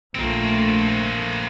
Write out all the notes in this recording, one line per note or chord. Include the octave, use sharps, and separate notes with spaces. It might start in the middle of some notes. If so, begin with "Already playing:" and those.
A#1 A3 A#3 C4